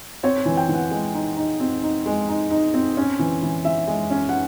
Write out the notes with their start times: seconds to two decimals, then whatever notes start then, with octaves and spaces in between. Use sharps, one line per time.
0.23 C4 C#5
0.46 E3
0.57 G5
0.69 E3
0.75 F#5
0.91 G#3
1.15 D#4
1.37 D#4
1.60 C4
1.83 D#4
2.06 G#3
2.29 D#4
2.51 D#4
2.74 C4
2.97 C#4
3.19 E3
3.42 E3
3.65 E3 E5
3.88 G#3
4.10 C#4
4.29 F#5